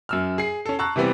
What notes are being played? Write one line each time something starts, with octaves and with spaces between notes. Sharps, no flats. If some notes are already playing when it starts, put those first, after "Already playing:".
F#2 E6 F6
G#4 C7
C#4 A4
A5 A#5 C#6 E6 F#6
C3 E3 G3 B3 C4